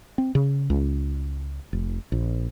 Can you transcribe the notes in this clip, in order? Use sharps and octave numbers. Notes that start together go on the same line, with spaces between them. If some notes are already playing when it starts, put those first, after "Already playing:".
C4
C#3
C#2
F1
A#1